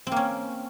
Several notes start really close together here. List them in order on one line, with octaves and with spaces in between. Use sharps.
C4 A#3 C#4